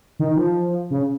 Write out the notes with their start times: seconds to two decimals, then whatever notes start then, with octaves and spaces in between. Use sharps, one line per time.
0.19 D#3
0.37 F3
0.90 C#3